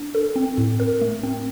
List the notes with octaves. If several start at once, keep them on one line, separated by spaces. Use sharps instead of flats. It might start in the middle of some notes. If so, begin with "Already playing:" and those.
Already playing: D4
A4
C4
A2
A#4
A3
C4